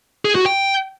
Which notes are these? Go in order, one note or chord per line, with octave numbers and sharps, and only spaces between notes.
G#4
F#4
G5